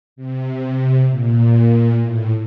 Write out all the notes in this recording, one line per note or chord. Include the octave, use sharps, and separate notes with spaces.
C3
A#2
A2